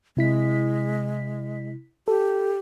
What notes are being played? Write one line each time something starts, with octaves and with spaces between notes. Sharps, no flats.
C3 G#3 E4 B6
G4 A4